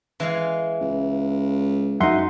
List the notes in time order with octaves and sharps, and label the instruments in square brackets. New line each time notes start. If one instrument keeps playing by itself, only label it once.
[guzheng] E3 G#3 F5
[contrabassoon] C#2
[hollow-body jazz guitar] F#2 D#4 [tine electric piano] E5 F#5 C6